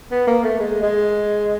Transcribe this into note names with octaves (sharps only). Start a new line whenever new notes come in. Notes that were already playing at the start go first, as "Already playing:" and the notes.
B3
A#3
A3
G#3
G#3